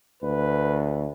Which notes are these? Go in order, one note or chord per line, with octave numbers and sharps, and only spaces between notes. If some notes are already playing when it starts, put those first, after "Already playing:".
D2 B4